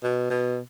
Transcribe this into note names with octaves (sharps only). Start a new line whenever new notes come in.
B2
B2